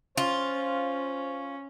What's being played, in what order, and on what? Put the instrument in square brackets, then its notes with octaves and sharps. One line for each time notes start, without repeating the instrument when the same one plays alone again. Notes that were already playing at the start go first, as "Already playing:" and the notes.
[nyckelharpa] C#4 [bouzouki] F4 [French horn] C5